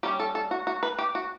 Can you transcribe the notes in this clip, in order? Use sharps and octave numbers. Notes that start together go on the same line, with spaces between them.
G3 C#4 G4
A4
A4
F#4
F#4
B4
G4
F#4